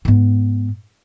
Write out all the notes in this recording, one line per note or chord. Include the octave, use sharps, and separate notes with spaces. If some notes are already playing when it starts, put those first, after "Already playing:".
G#2 B3